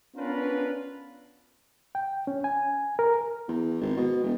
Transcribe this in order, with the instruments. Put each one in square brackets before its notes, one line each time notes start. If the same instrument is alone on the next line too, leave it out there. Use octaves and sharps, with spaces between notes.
[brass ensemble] B3 C#4 D4 F4 A#4 B4
[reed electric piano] G5
C#4
G#5
A#4
[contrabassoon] E2
G#1
B2
E1